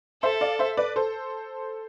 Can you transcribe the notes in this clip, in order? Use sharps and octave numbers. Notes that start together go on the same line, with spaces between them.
A4 C5 E5
D5 F5
C5 E5
B4 D5
A4 C5